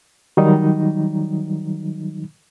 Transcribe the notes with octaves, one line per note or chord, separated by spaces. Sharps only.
D#3 F#3 G3 D#4